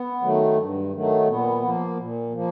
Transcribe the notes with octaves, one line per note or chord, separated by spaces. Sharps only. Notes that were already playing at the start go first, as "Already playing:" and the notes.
Already playing: B3
D#3 F#3 A3
G2
D#3 F#3 A3
A#2 B3
F3 A#3
A#2
F3 A#3